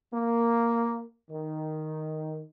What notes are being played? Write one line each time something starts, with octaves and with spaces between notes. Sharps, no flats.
A#3
D#3